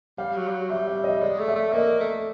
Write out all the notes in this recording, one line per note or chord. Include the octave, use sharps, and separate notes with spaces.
G3 F5
F#3
G3
F#3
G3 E5
E5
D#5
G#3 D5
A3
E5
A3
A#3 D#5
A3